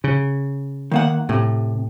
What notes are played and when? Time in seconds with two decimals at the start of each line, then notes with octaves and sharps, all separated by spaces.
0.04 C#3
0.91 D#3 A#3 F#5
1.29 A2 C3